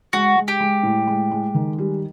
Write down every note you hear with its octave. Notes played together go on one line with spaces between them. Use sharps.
G#3 F#4
G#3
G4
G#3
A2
G#3
G#3
D#3
G3